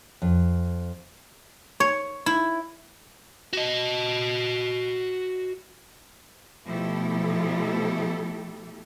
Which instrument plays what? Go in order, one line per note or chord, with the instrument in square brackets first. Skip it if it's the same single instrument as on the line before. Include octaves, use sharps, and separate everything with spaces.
[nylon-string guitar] F2
[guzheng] C#5
E4
[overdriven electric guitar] F#4 D#5
[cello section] B2 F3 A3 E4 G4 A4